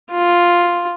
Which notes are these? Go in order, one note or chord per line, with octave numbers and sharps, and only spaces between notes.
F4